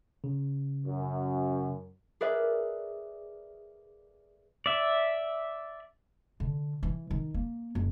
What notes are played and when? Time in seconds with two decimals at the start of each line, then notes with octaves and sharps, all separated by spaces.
0.24 C#3
0.85 F#2
2.21 G#4 A#4 B4 D5 E5
4.66 D5 E5
6.40 D3
6.83 E3
7.10 D#3
7.34 A#3
7.75 F#1